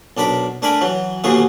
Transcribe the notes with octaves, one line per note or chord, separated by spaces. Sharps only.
B1 D4 A#4 B5 D6
A3 D4 A#4 G#5 B5 D6
E3 F#3
D#2 B2 E3 A3 A#3 G#4